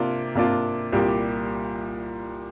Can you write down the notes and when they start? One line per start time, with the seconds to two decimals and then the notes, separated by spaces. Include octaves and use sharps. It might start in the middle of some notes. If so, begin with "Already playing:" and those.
Already playing: C3 A#3 D4 F4
0.35 C3 A#3 D4 F4
0.92 C2 A#2 G3 A#3 G4